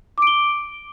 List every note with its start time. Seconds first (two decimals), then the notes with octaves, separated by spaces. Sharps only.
0.18 D6
0.22 D7
0.27 G7